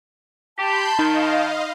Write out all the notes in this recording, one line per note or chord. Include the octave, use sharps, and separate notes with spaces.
G4 A5 B5 C6 G6
D#3 D#4 D#5 F5